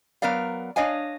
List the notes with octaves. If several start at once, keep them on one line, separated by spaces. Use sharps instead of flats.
F#3 B3 A#4 D5 F5
D4 C#5 D#5 F5 G#5